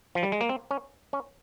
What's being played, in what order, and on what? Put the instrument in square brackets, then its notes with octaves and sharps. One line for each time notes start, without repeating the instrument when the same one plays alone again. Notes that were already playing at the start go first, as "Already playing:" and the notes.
[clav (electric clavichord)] F3
G3
G#3
A#3
C4
C#4
C#4